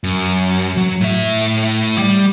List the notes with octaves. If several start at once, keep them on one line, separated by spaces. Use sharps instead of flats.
F#2
F#3
A2 E5
G3